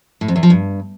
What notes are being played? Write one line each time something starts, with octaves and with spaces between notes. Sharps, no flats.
A2
F2
E2
F3
G2